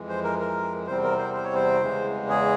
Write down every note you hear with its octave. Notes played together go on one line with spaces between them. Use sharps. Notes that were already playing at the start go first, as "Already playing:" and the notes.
Already playing: F2 E3 G#3
C5
A#4
A#4
E2 C3 G3 C4 C5
A#4
C5
C5
C#5
C5
E2 C#3 E3 G#3
G#4